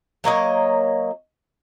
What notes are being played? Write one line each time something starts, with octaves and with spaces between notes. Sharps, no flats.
F#3 A#3 C#5 D#5